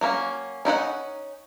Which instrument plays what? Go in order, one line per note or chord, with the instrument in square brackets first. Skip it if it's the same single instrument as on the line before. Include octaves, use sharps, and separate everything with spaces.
[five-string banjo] F#3 A#3 C#4
C#4 D#4 E4 F#5